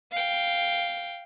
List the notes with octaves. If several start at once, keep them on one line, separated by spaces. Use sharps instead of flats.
F5 G5